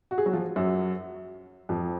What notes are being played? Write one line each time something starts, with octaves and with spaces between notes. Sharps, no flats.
F#4
G#4
F#3 F#4
F3 F4
F#2 F#3
F2 F3